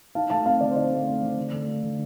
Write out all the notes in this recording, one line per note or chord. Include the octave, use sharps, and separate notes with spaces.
D#4 F5 A5
A3 F5 A5
C4 F5 A5
D3 D5
C5
D#4 D5
A3
C4
D3
D3
A3
D4
D3